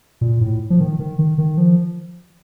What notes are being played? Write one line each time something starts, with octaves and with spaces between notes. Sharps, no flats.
A#2
A2
F3
D#3
D#3
D#3
D#3
F3